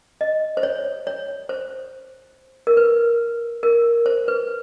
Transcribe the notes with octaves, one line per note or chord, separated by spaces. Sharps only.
D#5
C5
C#5
C#5
C5
A#4
B4
A#4
C5
B4